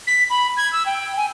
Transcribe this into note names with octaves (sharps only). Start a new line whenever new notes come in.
B6
B5
G#6
E6
G5
G#5